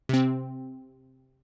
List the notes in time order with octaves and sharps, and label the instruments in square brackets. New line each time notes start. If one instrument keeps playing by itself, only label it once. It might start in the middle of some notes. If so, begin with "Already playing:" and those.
[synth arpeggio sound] C3 C4